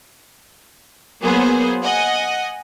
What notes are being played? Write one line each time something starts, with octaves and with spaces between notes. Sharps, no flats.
F#3 A#3 B3 G#4 C5
D#5 F#5 G#5